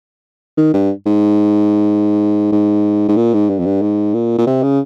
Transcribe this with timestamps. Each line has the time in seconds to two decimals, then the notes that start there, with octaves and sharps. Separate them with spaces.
0.57 D#3
0.74 G2
1.06 G#2
2.52 G#2
3.08 G#2
3.16 A#2
3.34 G#2
3.49 G2
3.59 F2
3.66 G2
3.82 G#2
4.14 A#2
4.38 A#2
4.47 C3
4.63 C#3